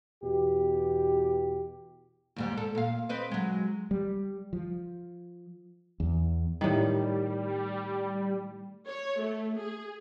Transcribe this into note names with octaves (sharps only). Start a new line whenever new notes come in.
E2 B2 G4
D#2 G#2 G3
A4
A#2 F5
C4 B4 D#5
F#3 G#3
G3
F3
E2
A2 D#3 G3
C#5
A3
G#4